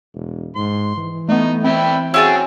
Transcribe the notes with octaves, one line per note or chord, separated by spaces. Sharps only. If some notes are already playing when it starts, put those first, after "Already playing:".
E1
G#2 C6
E3
A3 B3 D#4
C4 E5 G5 B5
C4 C#4 E4 F#4 G#4 A5 C#6 E6